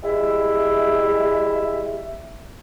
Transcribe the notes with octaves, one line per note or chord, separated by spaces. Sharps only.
G3 G#3 E4 E5